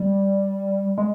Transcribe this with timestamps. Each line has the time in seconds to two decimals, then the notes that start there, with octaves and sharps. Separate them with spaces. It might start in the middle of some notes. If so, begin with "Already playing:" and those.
Already playing: G3
0.98 G#3